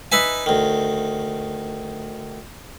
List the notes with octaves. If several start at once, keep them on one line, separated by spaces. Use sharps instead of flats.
D#4 B4 E5 G#5
D2 D#3